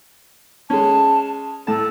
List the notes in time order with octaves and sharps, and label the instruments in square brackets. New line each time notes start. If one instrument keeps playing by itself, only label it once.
[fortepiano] G#3 C#4 [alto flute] A5
[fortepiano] A2 A5 [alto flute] A4